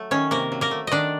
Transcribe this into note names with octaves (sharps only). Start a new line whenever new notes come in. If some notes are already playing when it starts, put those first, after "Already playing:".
Already playing: F#3 A3
D#3 C#4 C#5
C3 A#3 A#4
F#3
A#3 A#4
A3
D#3 D4 D5 D#5